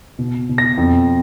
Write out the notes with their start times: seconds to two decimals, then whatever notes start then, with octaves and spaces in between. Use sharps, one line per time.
0.19 B2
0.49 B2
0.58 A#6
0.78 F2